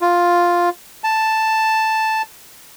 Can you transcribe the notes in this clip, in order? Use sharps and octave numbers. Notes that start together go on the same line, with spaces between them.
F4
A5